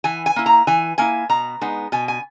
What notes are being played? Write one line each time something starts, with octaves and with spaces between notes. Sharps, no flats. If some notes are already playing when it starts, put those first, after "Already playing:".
E3 G#5
G#5
A#3 E4
A#5
E3 G#5
A#3 E4 G#5
B2 A#5
G#3 B3 D#4
B2 G#5
G#5